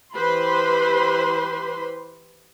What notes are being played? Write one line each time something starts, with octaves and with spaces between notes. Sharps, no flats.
E3 G4 B4 C5 B5 C6